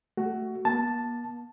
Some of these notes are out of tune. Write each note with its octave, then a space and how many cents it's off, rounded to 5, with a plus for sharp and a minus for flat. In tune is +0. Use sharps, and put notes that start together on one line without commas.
A3 +10 F#4 +20
A#3 +45 A5 +0